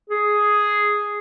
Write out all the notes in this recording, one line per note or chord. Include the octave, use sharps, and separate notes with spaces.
G#4